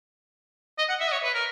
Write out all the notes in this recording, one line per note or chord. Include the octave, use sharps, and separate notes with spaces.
D#5
F#5
E5
D#5
C#5
B4
A#4